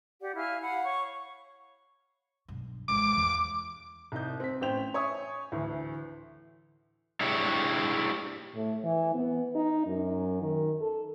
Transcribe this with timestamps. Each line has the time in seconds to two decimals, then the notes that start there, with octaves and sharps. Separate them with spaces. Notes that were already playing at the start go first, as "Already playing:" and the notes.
0.21 G4 D5 F#5
0.35 E4 F5 G#5 F6
0.61 F5 F#5 B5
0.84 C#5 C#6
2.48 B1 G2
2.88 G#1 E3 D6
3.17 E2 A#3
4.12 C2 D#4 G6
4.40 C4 B6
4.61 A1 C#4 C5 G5 G6 F7
4.94 C#5 E5 G#5 C#6 D#6
5.52 D2 A2 E3
7.21 D4 E4 G4 G#4 C#5
8.55 A2
8.84 E3
9.14 B3
9.55 D#4
9.87 F#2
10.42 D#3
10.81 A4